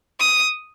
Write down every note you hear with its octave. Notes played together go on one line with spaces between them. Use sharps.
D#6